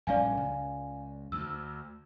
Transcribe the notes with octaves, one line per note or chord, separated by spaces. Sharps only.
A#1 G2 C#4 D5 F5 G#5
C#2
D2 E6